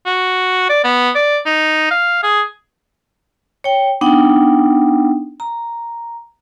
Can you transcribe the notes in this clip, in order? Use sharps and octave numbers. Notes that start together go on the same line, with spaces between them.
F#4
D5
B3
D5
D#4
F5
G#4
C#5 G5
B3 D4 D#4 F#5 G5
A#5